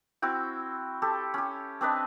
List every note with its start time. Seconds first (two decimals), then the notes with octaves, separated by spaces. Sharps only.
0.22 C4 E4 F#4 G5
1.02 G4 A4
1.34 C#4 G4
1.81 C4 D4 B4 D#5